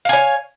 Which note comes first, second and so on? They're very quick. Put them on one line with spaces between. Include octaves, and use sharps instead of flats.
F5 G#5 C#5